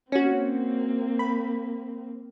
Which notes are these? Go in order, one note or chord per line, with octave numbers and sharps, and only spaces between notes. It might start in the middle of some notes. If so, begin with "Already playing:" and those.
A#3 C4 C#4 F#4
B5